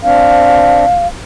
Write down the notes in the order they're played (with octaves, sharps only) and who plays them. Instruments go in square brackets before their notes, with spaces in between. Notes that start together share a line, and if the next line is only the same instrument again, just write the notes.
[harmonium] C4 D4 [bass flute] F5